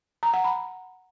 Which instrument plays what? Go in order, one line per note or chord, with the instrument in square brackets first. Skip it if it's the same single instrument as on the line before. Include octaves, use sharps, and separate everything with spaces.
[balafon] A#5
F#5
B5